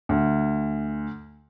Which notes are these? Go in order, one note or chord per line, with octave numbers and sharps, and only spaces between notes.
D2